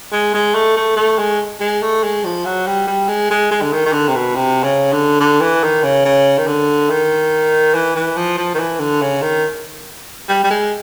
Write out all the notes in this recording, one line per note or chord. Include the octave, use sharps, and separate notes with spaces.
G#3
G#3
A3
A3
A3
G#3
G#3
A3
G#3
F3
F#3
G3
G3
G#3
G#3
G#3
D3
D#3
D#3
D3
C3
B2
C3
C#3
D3
D3
E3
D#3
C#3
C#3
D#3
D3
D#3
E3
E3
F3
F3
D#3
E3
D3
C#3
D#3
G3
G3
G#3